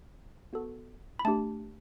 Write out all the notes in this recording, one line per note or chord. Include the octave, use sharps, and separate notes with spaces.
B3 F#4 A4
B5
A3 D4 G4 A5